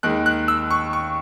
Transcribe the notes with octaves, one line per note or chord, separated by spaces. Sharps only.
D#2 D#3 G#3 F#6
F#6
E6
C#6
C#6